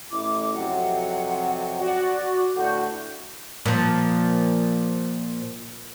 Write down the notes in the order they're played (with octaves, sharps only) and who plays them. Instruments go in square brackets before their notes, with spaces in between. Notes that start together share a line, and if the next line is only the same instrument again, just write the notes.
[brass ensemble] A1 E4 [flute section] D6
[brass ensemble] F2 C3 F#3 [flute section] F#5
[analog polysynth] F#4 D5
[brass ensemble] D2 A2 D3 [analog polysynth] F#4 [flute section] G6
[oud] A#2 F3